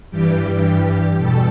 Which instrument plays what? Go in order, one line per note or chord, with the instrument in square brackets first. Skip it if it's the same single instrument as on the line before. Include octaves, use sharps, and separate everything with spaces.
[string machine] G2 E3 G3 G4
E2 B2 G3 A4